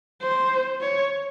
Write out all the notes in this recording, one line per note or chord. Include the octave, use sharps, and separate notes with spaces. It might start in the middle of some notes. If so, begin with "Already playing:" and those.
C5
C#5